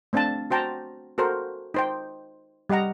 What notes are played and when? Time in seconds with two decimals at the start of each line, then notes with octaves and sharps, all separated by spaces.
0.13 A3 C4 D4 F5 A5
0.50 F#4 C5 G5 A5 A#5
1.18 F#4 A4 A#4 C5
1.74 D#4 C5 G5
2.69 G3 G4 D#5 F#5 A#5